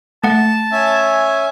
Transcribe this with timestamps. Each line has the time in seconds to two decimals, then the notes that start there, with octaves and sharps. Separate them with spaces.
0.24 A3 F#5 A5
0.72 C#4 E5 G#5